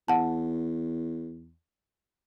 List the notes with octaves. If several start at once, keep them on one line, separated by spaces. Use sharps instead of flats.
E2 F#5 A5